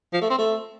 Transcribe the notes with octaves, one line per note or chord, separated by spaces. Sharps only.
F3
A3
C4
A3